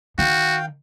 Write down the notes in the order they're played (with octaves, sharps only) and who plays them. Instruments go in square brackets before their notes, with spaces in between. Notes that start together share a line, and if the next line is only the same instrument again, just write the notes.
[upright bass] D#3 [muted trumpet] F#4 [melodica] F5 G5